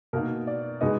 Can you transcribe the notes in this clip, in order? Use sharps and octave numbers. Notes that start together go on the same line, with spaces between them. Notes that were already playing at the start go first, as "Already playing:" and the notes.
B2 A#3 D#4 A#4
D5
B2 G#3 B3 D#4 D#5